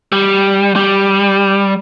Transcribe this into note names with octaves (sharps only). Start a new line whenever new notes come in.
G3
G3